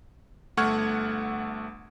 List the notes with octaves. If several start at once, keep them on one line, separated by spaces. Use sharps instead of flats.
G1 A3 F#5 C#6 F6 G#6